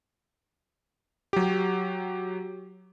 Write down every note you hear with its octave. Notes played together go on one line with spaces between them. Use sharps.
F#3 G4